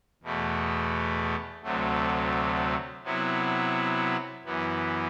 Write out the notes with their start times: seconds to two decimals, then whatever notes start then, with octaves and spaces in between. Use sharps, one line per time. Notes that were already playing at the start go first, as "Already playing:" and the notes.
0.23 E2 B2 A3
1.63 D2 C3 F#3 A3
3.04 C3 F#3 B3 E4
4.45 F#2 E3 B3